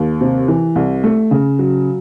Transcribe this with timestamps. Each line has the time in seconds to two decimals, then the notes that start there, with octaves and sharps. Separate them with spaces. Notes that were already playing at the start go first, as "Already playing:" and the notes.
Already playing: D#2
0.21 C3
0.48 E3
0.76 C2
1.04 A3
1.31 C#3
1.59 F#3